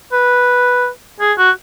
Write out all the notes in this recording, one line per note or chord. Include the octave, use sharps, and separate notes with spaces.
B4
G#4
F#4